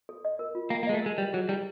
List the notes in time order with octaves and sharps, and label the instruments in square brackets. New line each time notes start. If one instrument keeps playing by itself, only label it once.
[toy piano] A4
D#5
A#4
F4
[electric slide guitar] A#3 [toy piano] G5
[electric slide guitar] A#3
[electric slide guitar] G#3 [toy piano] D#5
[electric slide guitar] A3
[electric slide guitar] G#3 [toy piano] A#4
[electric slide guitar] G3 [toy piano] B4
[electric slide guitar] F#3 [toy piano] G#4
[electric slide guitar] G3 [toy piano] E4